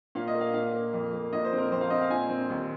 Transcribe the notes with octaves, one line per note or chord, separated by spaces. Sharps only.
A#2 F5
D#5
A#3
F5
A#2 F5
A#3
F2
A#3
A#2 D#5
C5
C4
A#4
F2 C5
F5
C4 D#5
F5
A#2 G#5
C4
D#2